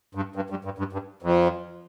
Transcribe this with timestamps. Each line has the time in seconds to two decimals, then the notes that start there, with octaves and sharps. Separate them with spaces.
0.15 G2
0.36 G2
0.50 G2
0.65 G2
0.78 G2
0.93 G2
1.22 F2